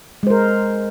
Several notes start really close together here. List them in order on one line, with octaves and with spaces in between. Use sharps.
G#3 C5 A#4